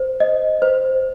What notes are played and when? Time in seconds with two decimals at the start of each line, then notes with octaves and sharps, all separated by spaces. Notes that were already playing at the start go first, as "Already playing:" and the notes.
Already playing: C5
0.20 D#5
0.62 C5